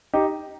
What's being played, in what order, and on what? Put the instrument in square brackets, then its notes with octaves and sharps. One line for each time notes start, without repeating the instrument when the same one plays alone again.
[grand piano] D#4 G4